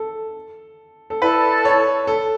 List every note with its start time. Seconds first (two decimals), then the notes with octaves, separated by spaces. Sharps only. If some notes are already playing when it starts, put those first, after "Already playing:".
Already playing: A4
1.10 A4
1.22 E4 A4 B4 D5 A5
1.65 C#5
2.07 A4